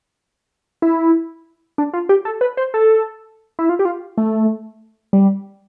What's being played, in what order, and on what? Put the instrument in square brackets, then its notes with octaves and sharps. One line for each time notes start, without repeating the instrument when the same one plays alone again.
[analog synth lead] E4
D4
F4
G4
A4
B4
C5
A4
E4
F4
G4
F4
A3
G3